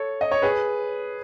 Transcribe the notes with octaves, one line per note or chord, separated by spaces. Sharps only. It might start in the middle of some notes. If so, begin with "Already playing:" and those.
Already playing: A4 C#5
D#5
C#5
G#4 B4